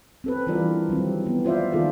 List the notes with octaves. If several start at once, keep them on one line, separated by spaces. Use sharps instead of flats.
C4 A4 B4
E3 G3 D4 F4 A#4 D5
D#3 F#3 G3 C4
B3
F4 C5 D5 E5 F5
D#3 A#3 F4 G#4 A4 D5